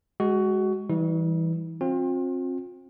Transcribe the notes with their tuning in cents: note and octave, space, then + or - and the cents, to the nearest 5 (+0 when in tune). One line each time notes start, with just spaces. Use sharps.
G#3 +0 F#4 +20
E3 +0 G3 +0 E4 -45
C4 +30 F4 +40